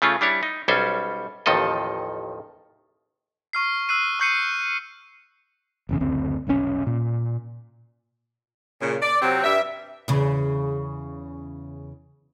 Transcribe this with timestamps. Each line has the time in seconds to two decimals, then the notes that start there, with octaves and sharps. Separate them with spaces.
0.02 C#3 A3 C#4 F4
0.21 G3 D4 E4 C#5
0.43 D#4
0.68 B1 G3 C#4 A4 C5
1.46 A1 D#2 D#3 F3 A4 D#5
3.53 C#6 F6 C7
3.89 E6 F#6 C7 D#7
4.20 C#6 E6 G6 C7 C#7 D#7
5.89 F#1 E2 C#3
6.00 F#1 D2 C4
6.47 F1 B1 B2 C#4
6.87 A#2
8.81 A#2 C#3
9.02 D5
9.22 C3 F#3 C4
9.44 G2 G3 E5
10.08 E2 C#3